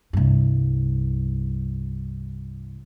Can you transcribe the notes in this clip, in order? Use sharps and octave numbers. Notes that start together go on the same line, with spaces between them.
C2 G2